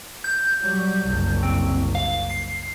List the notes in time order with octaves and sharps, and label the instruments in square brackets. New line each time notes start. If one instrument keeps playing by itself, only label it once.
[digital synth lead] G6
[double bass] F#3 G3
F#1 C2
[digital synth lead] C4
F5
C7